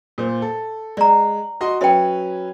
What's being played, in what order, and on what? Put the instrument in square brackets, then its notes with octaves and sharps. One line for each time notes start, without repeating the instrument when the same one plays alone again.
[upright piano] A#2 C5
A4
[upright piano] G#3 [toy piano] D5 A#5
[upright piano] F#4 D#5 C6
[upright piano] F#3 C#4 B4 [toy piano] E5 G5